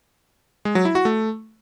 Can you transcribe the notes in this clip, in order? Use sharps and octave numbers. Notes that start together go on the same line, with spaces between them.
G#3
F#3
E4
F#4
A3